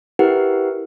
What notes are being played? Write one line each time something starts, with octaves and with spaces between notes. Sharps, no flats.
E4 G4 A#4 B4 F#5